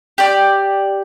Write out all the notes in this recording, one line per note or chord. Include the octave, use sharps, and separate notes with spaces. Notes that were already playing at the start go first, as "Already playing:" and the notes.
G4 D5